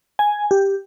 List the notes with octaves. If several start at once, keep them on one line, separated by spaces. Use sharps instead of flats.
G#5
G4